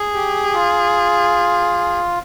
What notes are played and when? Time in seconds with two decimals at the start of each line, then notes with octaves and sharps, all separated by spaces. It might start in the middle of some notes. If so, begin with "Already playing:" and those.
Already playing: G#4
0.14 G4
0.54 F4